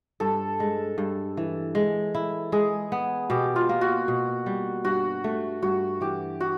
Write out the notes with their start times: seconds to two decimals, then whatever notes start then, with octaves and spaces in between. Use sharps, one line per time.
0.20 G2 A4
0.60 G#3
0.98 G2
1.37 E3
1.75 G#3
2.15 E4
2.52 G#3 G#4
2.92 B3
3.30 B2 G4
3.56 F4
3.69 A#3
3.81 F#4
4.08 B2
4.46 G3
4.84 G2 F#4
5.24 A3
5.62 G2 F#4
6.01 E3 G4
6.41 F#4